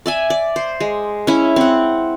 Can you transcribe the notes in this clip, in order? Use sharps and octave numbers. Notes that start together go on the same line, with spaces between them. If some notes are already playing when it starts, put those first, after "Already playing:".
D5 E5 G#5
D5
C5
G#3
C#4 E4
C4 F#5